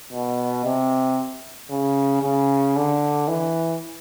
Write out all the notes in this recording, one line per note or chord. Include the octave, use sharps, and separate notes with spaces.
B2
C3
C#3
C#3
D3
E3